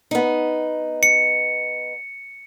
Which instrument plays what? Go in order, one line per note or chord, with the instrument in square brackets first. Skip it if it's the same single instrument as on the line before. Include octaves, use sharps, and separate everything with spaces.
[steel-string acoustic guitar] B3 D#4
[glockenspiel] C#7